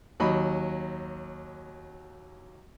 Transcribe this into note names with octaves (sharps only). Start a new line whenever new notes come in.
D#2 F#3 D#5 B5